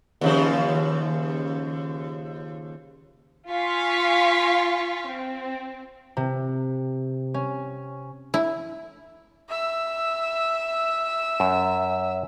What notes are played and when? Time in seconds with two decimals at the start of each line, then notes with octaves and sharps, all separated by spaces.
0.21 D#2 C#3 F3
3.49 F4 F5 G#5 C6 C#6 B6
5.08 C4
6.17 C3
7.34 C#4
8.34 E4
9.48 E5 E6
11.40 F#2